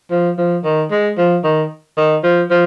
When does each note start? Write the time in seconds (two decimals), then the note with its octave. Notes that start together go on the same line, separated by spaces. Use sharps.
0.11 F3
0.38 F3
0.64 D#3
0.91 G#3
1.18 F3
1.44 D#3
1.97 D#3
2.23 F3
2.51 F3